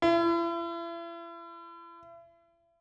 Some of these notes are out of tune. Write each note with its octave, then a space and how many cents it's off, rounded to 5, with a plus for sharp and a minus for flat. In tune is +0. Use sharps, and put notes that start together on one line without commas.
E4 +40